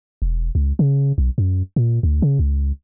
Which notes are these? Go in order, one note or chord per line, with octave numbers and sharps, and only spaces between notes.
E1
C#2
C#3
B1
F#2
A#2
D2
C#3
C#2